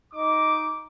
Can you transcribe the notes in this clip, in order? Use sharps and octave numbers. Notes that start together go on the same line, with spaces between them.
D#4 D#5 D6